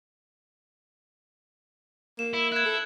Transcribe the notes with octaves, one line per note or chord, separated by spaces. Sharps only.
A#3 E7
E4
E4 F#6 G#6
A4